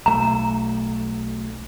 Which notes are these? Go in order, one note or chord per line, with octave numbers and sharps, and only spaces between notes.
B1 A3 A#5